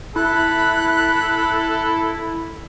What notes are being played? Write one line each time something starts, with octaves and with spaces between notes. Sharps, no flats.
E4 A4 B5 F#6